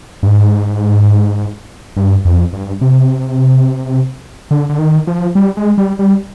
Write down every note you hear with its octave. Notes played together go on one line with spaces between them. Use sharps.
G2
G#2
G2
F2
G2
C3
D3
D3
D#3
F3
G3
G#3
G3
G3